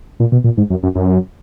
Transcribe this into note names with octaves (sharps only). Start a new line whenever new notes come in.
A#2
B2
A#2
G#2
F#2
F#2
F#2